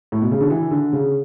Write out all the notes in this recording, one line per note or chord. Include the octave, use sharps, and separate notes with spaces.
A2
B2
C#3
D3
E3
D3
C#3